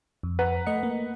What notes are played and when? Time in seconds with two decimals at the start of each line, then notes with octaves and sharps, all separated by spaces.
0.23 F2
0.39 B4 F#5 A#5
0.66 A3 D#5 C#7
0.83 A#3